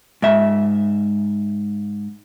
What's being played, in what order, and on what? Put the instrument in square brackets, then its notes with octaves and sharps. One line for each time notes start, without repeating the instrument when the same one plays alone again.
[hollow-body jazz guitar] G#2 E5